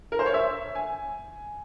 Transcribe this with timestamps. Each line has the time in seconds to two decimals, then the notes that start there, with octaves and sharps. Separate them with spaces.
0.12 A#4
0.19 C5
0.26 C#5
0.34 E5
0.75 G#5